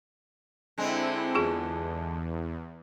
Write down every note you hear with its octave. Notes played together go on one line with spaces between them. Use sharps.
D3 G#3 C4 E4
E2 F4 G#4